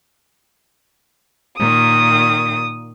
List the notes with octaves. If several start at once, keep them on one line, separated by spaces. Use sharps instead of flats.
A#2 D#3 D#6